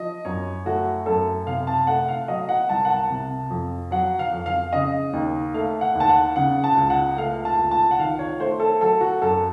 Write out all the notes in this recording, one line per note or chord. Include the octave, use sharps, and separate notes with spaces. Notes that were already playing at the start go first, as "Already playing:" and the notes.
Already playing: F3 D#5
F#2 C#5
A3 F#4
F#2 A4
C3 F5
A5
A3 F#5
F5
F#3 D#5
F#5
C2 A5
F#5
A5
C3
F2
F#3 F#5
F5
F2
F5
C#3 D#5
D#2
A3 F5
F#5
D#2
A5
F#5
C#3 F#5
A5
C#2
F#5
A3 F5
A5
C#2
A5
F#5
D#3 F5
C#5
A3 C5
A4
F#3 A4
F#4
F#2 A4